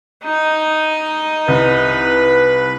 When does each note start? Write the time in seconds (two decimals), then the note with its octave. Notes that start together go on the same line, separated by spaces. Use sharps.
0.24 D#4 D#5
1.48 C2 B4